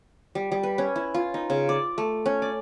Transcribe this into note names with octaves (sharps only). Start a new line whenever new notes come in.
G3
G3
B4
C#4
E4
F4
D#4
C#3
D5
A3
C#4
D5